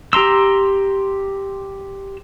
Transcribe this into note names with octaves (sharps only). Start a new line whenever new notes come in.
G4 A#5 C6 E6